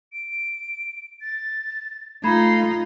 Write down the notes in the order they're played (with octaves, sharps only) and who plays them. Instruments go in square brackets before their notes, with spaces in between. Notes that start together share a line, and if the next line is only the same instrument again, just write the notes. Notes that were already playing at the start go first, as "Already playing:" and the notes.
[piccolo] D7
A6
[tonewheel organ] A3 [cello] D#4 F4 [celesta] A#5 B5 G#6 [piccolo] C7